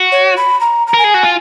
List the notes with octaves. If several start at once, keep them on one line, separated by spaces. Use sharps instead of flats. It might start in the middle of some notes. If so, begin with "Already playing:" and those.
Already playing: F#4
C#5
B5
A#5
A#5
A#4 G#5
G#4
F#4
F4